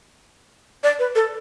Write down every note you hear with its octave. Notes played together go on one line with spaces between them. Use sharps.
D5
B4
A4